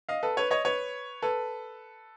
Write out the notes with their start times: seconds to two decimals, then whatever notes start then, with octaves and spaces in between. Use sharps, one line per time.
0.09 D#5 F5
0.23 A4 B4
0.37 B4 C#5
0.51 C#5 D#5
0.65 B4 C#5
1.22 A4 B4